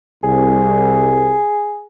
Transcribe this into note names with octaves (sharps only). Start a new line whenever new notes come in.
C2 G#4